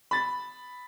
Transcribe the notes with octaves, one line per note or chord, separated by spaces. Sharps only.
B5 A6